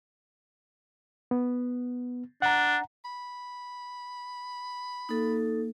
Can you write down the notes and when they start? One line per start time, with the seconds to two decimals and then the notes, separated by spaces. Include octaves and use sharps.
1.31 B3
2.42 D4 F#5 A#5
3.05 B5
5.09 A#3 D#4 A4